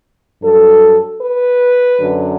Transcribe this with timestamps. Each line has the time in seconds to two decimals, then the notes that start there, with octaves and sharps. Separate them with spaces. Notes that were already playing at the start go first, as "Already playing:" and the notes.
0.42 G2 F#3 A4
1.21 B4
1.98 F#2 D3 F#3